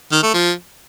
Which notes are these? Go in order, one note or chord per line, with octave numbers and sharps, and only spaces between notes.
D#3
A3
F3